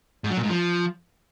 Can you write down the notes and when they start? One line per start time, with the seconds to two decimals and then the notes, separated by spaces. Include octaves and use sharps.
0.24 G#2
0.30 F#3
0.37 A#2
0.43 G#2
0.50 F3